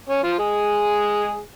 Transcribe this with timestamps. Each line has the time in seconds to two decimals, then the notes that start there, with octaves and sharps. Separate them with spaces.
0.09 C#4
0.23 F3 F4
0.38 G#3 G#4